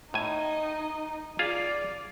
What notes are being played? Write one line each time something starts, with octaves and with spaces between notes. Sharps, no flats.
A2 D#4 D#5 G#5
F4 G#4 D5 F5